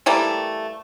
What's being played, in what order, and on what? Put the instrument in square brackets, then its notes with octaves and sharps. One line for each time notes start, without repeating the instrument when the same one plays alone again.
[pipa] E3 G3 A3 A#3